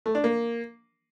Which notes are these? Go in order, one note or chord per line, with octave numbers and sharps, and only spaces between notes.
A3
D4
A#3